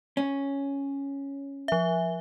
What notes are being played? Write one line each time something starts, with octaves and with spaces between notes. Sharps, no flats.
C#4
F3 E5